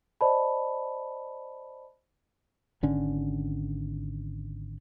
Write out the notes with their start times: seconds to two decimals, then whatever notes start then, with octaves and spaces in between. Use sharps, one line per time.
0.21 C5 D5 D#5 A5 B5
2.83 G#1 D3 C#4